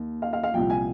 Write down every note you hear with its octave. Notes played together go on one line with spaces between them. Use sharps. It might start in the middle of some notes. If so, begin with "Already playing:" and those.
Already playing: D#2 D#3
F5
F5
F5
C2 A#2 F3 G5
G#5